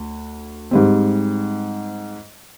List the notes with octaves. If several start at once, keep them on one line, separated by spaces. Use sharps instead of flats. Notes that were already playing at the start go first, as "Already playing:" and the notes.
Already playing: D2
G#2 G3 C4